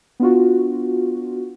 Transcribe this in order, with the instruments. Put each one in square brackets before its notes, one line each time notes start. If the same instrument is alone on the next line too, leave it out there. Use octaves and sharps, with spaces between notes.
[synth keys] B3 D4 F4 F#4